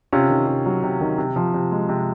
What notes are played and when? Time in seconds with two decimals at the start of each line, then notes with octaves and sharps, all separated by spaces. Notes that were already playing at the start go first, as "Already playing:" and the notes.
0.13 C3 C#4 F4
0.29 D#3
0.47 C3
0.66 F#3
0.83 C3
1.01 D#3
1.18 C3
1.36 F3
1.54 C3
1.71 G#3
1.89 C3